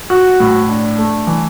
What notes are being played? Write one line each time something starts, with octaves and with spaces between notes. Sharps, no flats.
F#4
A2
D4
A3
E3